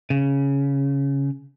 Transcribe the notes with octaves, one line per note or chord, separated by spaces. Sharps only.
C#3